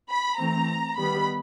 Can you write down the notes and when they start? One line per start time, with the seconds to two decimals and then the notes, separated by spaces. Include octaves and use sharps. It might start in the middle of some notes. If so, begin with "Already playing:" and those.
0.10 B5
0.39 E3 A3 C4 A#5
0.97 D#3 G3 B3 B5